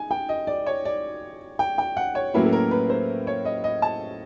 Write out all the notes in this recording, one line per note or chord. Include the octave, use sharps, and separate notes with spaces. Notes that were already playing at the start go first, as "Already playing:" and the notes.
Already playing: D#4 G#5
G5
D#5
D5
C#5
D5
G5
G5
F#5
C#5
A2 F#3 A#3 C#4 E4 B4
A4
A#4
B4
C5
C#5
D#5
D#5
A5